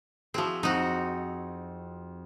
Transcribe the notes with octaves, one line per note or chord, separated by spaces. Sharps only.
F3 C4 E4 F#4 G#4
F2 C4 D#4 F#4